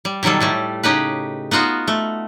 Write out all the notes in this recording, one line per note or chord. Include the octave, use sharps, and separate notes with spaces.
G3
B2 D#3 F#3 G3 A4
A2 G3 A3
C#3 D#4 G4 B4
B3 D#4 F4 F#4
A3